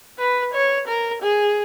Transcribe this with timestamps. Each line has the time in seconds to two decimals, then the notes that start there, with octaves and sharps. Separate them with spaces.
0.19 B4
0.54 C#5
0.88 A#4
1.22 G#4